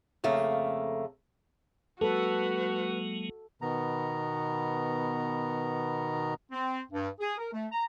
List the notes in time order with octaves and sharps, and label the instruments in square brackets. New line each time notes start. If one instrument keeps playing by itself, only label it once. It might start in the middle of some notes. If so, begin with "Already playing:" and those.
[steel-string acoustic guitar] F2 C#3 A3 A#3
[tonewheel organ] F#3 G#3 A#3 [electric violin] F#4 [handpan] A4 [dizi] B4
[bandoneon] B2 D#3 B3 A#5
[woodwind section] C4
G2
G#4
A#4
A3
A#5